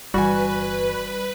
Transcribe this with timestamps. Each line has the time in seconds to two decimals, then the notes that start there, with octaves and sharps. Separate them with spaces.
0.14 G1 E3 G3 F#4 B4 G#5